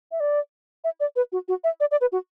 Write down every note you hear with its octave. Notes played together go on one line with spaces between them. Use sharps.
E5
D5
E5
D5
B4
F#4
F#4
E5
D5
D5
B4
F#4